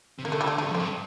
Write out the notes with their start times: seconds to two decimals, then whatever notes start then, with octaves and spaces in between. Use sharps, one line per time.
0.19 C3
0.25 D3 A#3
0.32 A3
0.41 G3
0.47 A3
0.58 D3 A3
0.63 G2
0.69 F2
0.75 C4
0.80 G2